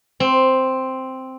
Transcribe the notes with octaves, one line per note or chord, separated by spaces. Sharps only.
C4